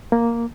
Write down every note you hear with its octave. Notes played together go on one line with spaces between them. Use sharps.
A#3